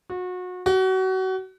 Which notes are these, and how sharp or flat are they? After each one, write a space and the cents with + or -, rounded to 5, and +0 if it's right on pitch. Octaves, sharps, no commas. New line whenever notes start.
F#4 -30
F#4 +30